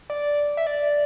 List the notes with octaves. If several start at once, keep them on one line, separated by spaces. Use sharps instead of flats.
D5
E5
D5